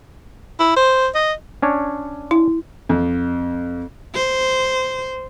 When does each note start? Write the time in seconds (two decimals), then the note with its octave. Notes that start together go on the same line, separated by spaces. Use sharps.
0.60 E4
0.76 C5
1.15 D#5
1.62 C#4 D4 C#5
2.31 E4
2.89 F2
4.15 C5